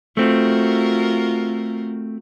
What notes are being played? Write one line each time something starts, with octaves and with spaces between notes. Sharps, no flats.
A3 C4 F4 F#4 A#4